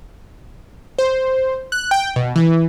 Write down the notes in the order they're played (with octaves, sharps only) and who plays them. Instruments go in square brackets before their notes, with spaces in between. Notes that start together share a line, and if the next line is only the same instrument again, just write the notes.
[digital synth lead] C5
F#6
G5
B2
E3